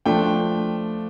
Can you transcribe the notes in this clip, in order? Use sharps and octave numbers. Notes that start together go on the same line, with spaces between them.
F3 A3 D4 F4 G5